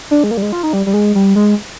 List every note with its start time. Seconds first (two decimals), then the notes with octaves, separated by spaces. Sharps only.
0.11 D4
0.24 G#3
0.31 A#3
0.37 G3
0.42 G#3
0.52 F4
0.63 D#4
0.73 G3
0.86 G3
0.93 G#3
1.15 G3
1.36 G#3